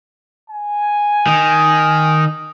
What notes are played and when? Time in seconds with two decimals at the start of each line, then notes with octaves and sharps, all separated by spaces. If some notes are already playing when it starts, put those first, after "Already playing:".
0.50 G#5
1.27 D#3